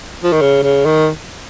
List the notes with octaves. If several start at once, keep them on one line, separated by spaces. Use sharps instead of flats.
F3
D#3
C#3
C#3
D#3